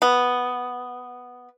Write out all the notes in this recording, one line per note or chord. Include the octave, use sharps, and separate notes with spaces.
B3